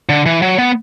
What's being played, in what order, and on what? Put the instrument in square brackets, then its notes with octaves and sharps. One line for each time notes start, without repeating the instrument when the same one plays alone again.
[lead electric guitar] D3
E3
F#3
B3